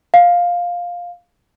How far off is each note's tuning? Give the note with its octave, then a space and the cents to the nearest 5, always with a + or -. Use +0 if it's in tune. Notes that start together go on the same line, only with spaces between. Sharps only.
F5 +10